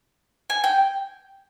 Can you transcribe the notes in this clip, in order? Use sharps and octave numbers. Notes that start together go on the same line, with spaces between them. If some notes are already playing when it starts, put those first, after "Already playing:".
G#5
G5